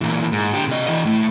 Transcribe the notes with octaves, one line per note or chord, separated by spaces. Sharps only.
A#2 E3
G#2
D3 G4
C3 D#5
E3 D#5
A2